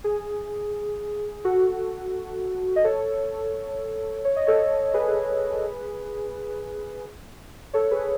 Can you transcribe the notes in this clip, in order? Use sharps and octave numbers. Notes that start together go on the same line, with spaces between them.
G#4
F#4 A4
D#5
A4 C#5
C#5
D#5
A4 C#5
G#4 B4
A4 C#5
G#4 B4